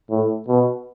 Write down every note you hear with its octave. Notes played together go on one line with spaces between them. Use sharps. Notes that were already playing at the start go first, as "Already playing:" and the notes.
A2
B2